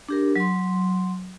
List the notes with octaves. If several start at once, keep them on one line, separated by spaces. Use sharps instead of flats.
D4 G4 A#4
F#3 C6